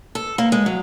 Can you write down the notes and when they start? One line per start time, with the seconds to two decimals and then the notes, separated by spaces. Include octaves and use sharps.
0.15 A4
0.38 A#3
0.52 G#3
0.66 F#3